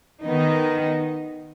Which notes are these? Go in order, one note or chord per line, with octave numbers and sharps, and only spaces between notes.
D#3 B3 D#4